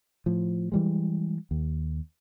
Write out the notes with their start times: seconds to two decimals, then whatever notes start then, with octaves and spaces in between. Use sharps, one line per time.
0.26 A2 F3
0.72 E3 G3 G#3
1.51 D#2